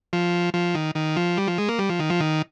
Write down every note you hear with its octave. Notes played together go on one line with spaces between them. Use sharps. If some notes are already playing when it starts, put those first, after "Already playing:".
F3
F3
D#3
D#3
F3
G3
F3
G#3
A#3
G3
F3
D#3
F3
D#3